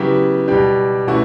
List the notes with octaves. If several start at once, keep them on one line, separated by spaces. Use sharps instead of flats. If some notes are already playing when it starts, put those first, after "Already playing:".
Already playing: C#3 F#3 B3 E4 G4
B2 G3 D4 G4
B2 A3 C#4 E4 F#4